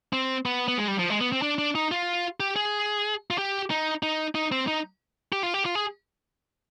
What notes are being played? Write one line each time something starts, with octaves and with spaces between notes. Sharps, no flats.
C4
B3
B3
G#3
G3
F3
G#3
B3
C4
D4
D4
D#4
F4
G4
G#4
F4
G4
D#4
D#4
D#4
C4
D#4
G4
F4
G4
F4
G#4